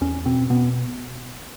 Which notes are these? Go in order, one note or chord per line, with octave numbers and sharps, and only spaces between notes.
E2 C#4
B2 C4
B2 B3